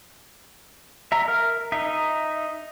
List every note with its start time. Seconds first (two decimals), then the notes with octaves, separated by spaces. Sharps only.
1.12 E5 A#5
1.28 A#4 F6
1.72 D#4 E5